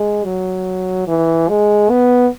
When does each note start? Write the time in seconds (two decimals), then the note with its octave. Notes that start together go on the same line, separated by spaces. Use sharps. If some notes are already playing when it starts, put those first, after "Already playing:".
Already playing: G#3
0.25 F#3
1.07 E3
1.49 G#3
1.90 B3